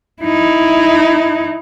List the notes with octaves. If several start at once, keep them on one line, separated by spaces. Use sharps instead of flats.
D#4 E4